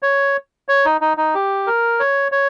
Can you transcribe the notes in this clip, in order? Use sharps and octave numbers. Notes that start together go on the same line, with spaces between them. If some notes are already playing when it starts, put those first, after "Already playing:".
C#5
C#5
D#4
D#4
D#4
G4
A#4
C#5
C#5